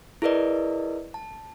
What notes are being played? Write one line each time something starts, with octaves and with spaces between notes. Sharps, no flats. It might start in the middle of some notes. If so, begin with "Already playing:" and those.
E4 G#4 A#4 B4 D5 D#5
A5